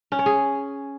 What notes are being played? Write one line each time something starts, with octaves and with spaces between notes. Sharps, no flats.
C#4
C#5
G#4